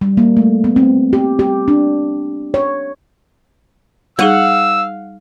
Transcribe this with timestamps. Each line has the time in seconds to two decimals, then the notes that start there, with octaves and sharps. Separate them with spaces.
0.01 G3
0.17 A#3
0.37 A3
0.64 B3
0.76 C4
1.13 G4
1.39 G4
1.68 D4
2.54 C#5
4.19 G3 D#4 G#4 F5 F#5 E6